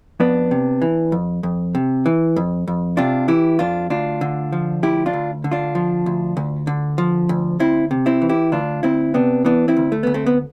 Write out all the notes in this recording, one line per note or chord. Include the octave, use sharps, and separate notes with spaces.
F2 B3 D4
C3
E3
F2
F2
C3
E3
F2
F2
C3 D4 F4
E3 E4 G4
F2 D4 F4
D2 D4 F4
D3
F3
D2 E4 G4
D4 F4
D2
D3
D4 F4
F3
D2
D2
D3
F3
D2
D2 C4 E4
C3
C4 E4
E3
E4 G4
D2 D4 F4
D2 C4 E4
C3 B3 D4
E3 B3 D4
C4 E4
D2
A3
D2 B3
A3 C4
B3